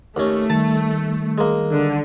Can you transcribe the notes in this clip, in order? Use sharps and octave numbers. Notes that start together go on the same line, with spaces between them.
D#2 A3 C#4
D#3 G3 A5
G#3 A#3
D3